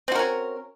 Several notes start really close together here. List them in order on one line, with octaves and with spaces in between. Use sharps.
C4 F#4 A#4 C#4